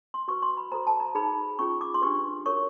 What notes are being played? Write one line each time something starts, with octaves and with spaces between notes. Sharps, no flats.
C6
F#4 B4 C#6
C6
B5
F#4 A4 C5 A#5
A5
A#5
D#4 G#4 B4 B5
C#4 F4 G#4 C#6
D6
C6
D4 G4 B4 C#6
F#4 A#4 C#5 C#6